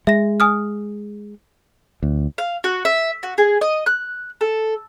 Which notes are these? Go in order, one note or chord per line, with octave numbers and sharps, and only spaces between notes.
G#3 E5 A#6
G#5 D#6 F6
D2
F5
F#4
E5
F#4
G#4
D#5
F#6
A4